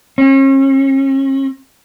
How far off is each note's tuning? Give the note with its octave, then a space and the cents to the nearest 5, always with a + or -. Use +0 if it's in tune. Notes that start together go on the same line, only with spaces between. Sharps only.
C#4 -40